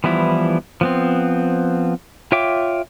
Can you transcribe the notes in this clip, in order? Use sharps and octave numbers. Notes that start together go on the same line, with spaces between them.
E3 F3 G3 B3 E4
F3 B3 C4
F4 C#5 E5 G5 D6